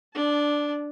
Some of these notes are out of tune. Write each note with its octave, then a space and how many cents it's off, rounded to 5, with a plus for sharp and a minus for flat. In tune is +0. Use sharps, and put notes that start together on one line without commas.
D4 +0 A5 -20